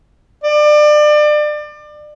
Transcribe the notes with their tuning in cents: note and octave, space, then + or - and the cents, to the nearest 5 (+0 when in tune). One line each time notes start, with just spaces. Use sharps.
D5 +30